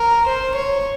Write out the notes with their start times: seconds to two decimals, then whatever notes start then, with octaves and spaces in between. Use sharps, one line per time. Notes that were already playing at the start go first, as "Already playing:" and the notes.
Already playing: A#4
0.27 C5
0.55 C#5